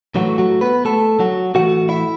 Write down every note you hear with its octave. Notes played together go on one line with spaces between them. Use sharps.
A2 E3 F#3 A3 F#4
F#3 F#4
B3 B4
A3 A4
F#3 F#4
A2 E3 A3 F#4 F#5
E4 E5